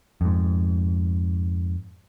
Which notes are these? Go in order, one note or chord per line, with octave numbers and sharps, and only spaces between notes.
F2 G#2